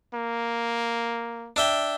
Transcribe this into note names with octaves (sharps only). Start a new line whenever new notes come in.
A#3
D4 E5 G5